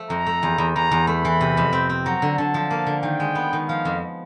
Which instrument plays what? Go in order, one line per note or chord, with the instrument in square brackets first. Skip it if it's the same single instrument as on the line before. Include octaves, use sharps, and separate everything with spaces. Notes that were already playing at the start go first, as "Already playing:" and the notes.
Already playing: [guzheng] F3 A3
[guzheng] F2 [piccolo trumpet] A#5
[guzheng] A3
E2
E2
[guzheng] E2 [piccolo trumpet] A#5
[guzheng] E2
[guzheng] A3 [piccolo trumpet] B5
[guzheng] E3
C3
F2
C4
C4
[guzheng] F#3 [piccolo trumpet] A#5
[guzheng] D3
[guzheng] D3 [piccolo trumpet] A5
[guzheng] F3
A#3
D3
[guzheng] D#3 [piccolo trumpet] G5
[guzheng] G#3
B3
D#3
[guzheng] F3 [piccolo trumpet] F5
[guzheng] F2